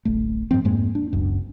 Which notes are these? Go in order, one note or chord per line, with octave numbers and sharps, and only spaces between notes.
D1 A1 A3
G#2 B2 F3 C4
F2 G#2 G#3 A#3
D4
F#1 C#2 F#2 B2